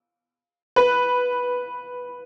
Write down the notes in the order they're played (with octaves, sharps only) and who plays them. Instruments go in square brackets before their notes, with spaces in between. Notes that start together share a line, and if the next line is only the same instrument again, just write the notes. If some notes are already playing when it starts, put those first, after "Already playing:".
[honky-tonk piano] B4